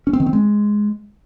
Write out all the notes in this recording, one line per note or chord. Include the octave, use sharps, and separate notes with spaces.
C#4
C4
D#3
C4
G#3